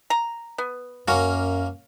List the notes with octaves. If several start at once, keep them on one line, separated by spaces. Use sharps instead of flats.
A#5
B3
F#2 A#3 C#4 F#4